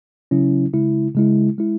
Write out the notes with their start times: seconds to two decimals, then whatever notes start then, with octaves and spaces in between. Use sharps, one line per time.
0.31 C#3 F#3 C#4 E4
0.73 C#3 G#3 E4
1.15 C#3 G#3 E4
1.58 G#3 E4